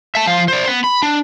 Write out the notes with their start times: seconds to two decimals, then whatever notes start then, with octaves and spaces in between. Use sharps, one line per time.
0.15 E5 A5
0.27 F3 F5
0.48 C5 D5
0.68 B3
0.84 B5
1.03 D4